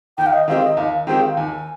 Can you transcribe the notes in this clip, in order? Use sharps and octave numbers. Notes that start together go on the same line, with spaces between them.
D#2 G5
F5
D#5
D#3 G#3 C4 G4 F5
D#5
D#2 F5
D#3 G#3 C4 G4 G5
F5
D#2 G#5